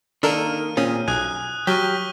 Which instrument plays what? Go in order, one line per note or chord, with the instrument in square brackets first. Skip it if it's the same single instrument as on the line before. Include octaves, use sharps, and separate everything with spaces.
[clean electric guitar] D#3 A#3 [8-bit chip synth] D4 A4 A#4 [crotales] F6 D#7
[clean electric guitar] A#2 C4 G#4 [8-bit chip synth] C#4
[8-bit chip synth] B1 [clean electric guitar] G#5 [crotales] D#6 F#6
[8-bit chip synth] F#3 [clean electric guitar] G4 [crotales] C#6 F6 G7